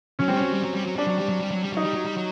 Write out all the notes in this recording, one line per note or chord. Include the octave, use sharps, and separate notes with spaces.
F#3 C#4
G3 C4
F#3 C#4
G3
F#3
G3
F#3
G3 D4
F#3
G3
F#3
G3
F#3
G3
F#3 D#4
G3
F#3
G3
F#3